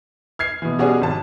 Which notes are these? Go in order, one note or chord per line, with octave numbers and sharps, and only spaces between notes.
F6 G#6 C7
B2 E3
B2 G3 C#4 D4 F#4 G#4
G#1 A5